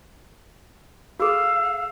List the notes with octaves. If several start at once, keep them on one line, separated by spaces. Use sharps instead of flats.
F#4 G#4 A4 F5 E6